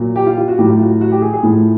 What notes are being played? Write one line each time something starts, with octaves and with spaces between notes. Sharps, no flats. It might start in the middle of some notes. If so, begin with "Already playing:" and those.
Already playing: A#2 F#3
G4
F4
F4
F#4
A2 F#3 G4
F4
F#4
F#4
G4
G#4
G#4
A2 F3